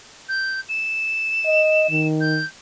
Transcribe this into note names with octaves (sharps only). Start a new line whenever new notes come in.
G6
E7
D#5
D#3
G6